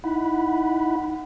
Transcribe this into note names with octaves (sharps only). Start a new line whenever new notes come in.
D#4 E4 F#5 B5